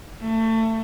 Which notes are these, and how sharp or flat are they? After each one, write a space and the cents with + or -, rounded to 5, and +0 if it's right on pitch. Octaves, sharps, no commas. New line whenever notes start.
A3 +25